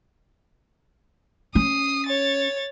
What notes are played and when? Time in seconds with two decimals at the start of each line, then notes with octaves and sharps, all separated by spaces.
1.55 C#4 D#6 C7
2.06 C#5 A6